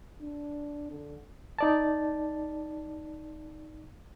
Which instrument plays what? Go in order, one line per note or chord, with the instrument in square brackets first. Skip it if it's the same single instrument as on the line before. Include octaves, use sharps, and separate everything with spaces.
[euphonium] D4
D3
[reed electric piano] D#4 D5 A5